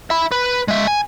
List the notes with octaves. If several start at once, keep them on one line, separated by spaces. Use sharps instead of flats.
E5 B5
B4
G#3 E5
G#5